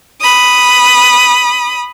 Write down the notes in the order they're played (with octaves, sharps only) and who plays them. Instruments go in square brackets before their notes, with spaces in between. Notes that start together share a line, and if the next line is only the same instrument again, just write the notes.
[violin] B5 D#6